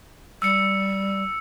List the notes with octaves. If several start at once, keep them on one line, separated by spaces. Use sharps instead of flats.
G3 E6 C#7